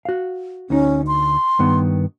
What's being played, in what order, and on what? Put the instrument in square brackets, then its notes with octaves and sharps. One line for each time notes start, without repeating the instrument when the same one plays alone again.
[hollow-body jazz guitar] F#4 F5
[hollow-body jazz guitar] D2 D#4 [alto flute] C#4
[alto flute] C6
[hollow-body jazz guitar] G2 D#3 B3